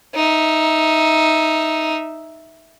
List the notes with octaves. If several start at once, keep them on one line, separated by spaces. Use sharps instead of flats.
D#4 E5